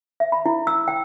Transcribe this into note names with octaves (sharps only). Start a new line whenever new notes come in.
E5
B5
E4
E6
G5